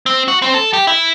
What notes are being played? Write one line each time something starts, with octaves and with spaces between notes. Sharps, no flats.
C4
F#4
C4
A4
G4
E4